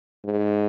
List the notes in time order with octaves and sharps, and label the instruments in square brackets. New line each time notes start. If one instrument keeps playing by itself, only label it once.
[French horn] G#2